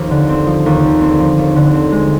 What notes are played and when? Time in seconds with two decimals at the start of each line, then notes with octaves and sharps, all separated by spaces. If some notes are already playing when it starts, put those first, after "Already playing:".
Already playing: D#2 F3 C4
0.11 D3
0.29 C4
0.47 F3
0.66 D#2
0.84 D3
1.01 C4
1.20 F3
1.38 D#2
1.56 D3
1.74 C4
1.92 G#3